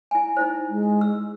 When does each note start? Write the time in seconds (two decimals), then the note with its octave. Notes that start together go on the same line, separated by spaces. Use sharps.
0.11 E4 G#5
0.37 D#4 E4 C5
0.69 G#3
1.01 E6